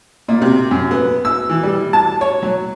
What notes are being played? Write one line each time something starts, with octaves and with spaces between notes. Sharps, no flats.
A#2
C3
F#2
B3
E6
E3
G3
A5
C#5
F#3